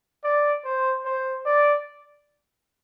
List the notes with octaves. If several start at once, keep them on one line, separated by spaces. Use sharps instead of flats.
D5
C5
C5
D5